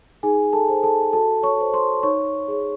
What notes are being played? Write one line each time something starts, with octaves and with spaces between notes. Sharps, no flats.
D#4 G#4 G#5
A4 A5
G#4 C5
A4 A5
F#4 A4 A5
C#5 C#6
A4 C5
C5 C6
D#4 C#5 C#6
G#4 C#5